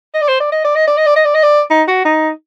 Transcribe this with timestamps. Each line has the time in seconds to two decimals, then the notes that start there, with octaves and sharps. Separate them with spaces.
0.14 D#5
0.22 D5
0.28 C5
0.40 D5
0.52 D#5
0.64 D5
0.75 D#5
0.87 D5
0.97 D#5
1.06 D5
1.16 D#5
1.24 D5
1.34 D#5
1.43 D5
1.70 D#4
1.88 F#4
2.05 D#4